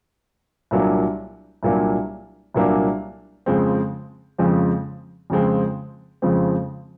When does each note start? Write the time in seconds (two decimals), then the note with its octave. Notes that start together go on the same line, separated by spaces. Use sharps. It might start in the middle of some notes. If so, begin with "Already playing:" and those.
0.71 C2 A#2 F#3 A#3 D4
1.63 C2 A#2 F#3 A#3 D4
2.54 C2 A#2 F#3 A#3 D4
3.46 F2 C#3 F3 G#3 C4
4.38 F2 C#3 F3 G#3 C4
5.30 F2 C#3 F3 G#3 C4
6.22 F2 C#3 F3 G#3 C4